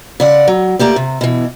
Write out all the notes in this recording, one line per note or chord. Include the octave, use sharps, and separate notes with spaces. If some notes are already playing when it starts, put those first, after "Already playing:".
C#3 D5 F#5
F#3
A3 A#3 G4 D5
C3
B2 E3